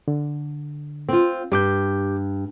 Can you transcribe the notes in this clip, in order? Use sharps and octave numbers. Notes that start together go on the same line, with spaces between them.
D3
C4 F4
G2 G4 D6 G6